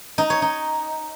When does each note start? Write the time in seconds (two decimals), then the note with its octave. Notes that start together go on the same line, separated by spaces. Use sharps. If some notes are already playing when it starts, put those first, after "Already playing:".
0.18 D#4
0.30 C#5
0.42 D#4